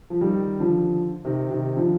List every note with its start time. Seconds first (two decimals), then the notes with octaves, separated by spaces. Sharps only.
0.10 F3
0.21 D#3 G3
0.60 D3 F3
1.25 C3 D#3
1.51 C3 D#3
1.77 D3 F3